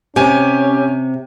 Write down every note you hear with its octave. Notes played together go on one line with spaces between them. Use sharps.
C3 C#4 G4 G#5